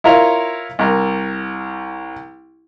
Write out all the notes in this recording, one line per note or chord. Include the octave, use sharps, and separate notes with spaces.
E4 F4 A#4 C#5 F5
C2 A#4